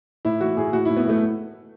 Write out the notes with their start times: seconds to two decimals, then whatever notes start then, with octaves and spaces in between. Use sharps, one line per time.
0.25 A2 E4
0.41 E3 F#4
0.57 A2 G#4
0.73 A2 F#4
0.85 A2 E4
0.97 B3
1.05 A2 A3